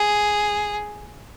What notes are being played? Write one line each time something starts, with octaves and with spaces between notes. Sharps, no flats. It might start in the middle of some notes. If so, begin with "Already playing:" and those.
Already playing: G#4